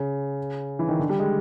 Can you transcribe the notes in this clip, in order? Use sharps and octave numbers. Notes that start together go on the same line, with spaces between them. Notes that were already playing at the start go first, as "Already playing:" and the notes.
Already playing: C#3
E3
D#3
D3
G3
G#3